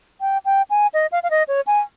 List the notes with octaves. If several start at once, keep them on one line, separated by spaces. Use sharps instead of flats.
G5
G5
G#5
D#5
F5
F5
D#5
C#5
G#5